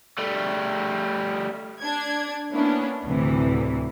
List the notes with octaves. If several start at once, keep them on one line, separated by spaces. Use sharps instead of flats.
G3 A3
D4 G#6
A#3 B3 C#4 D4 E4
D2 A2 C3 E3